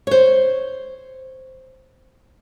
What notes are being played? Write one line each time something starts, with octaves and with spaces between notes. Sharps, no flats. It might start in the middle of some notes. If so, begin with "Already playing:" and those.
C5 C#5